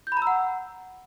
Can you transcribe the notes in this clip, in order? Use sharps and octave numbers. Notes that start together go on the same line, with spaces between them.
G6
B5
A#5
E6
F#5